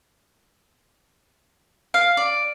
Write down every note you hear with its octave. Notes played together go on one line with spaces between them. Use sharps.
F5
D5